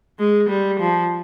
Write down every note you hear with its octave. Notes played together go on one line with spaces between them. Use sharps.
G#3
G3
F3